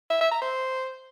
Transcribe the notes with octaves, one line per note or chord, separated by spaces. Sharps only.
E5
E5
A#5
C5